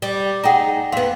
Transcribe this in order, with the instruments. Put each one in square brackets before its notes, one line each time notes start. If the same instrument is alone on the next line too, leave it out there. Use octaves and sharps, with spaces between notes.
[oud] G3
[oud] D#4 G#4 [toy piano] F#5 G5 A#5
[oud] F2 B3 [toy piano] F5 C6